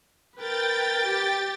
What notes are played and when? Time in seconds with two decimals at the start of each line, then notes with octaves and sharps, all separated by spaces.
0.36 A#4 B4 G5 A6
1.06 G4